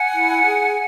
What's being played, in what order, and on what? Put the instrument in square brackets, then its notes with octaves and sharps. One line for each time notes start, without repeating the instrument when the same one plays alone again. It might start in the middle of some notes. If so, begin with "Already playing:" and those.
Already playing: [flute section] F#5 G#5
E4
G#4